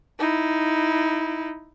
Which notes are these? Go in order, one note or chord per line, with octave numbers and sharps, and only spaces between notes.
D#4 E4